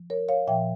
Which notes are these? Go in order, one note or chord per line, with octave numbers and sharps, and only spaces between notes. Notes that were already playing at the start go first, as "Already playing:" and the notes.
Already playing: F3
A#4 C#5
C#5 F5
A#2 F3 E5 G5